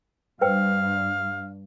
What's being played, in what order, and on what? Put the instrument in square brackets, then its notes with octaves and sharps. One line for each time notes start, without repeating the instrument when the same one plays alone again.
[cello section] G2 [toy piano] B4 C5 G5 [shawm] F5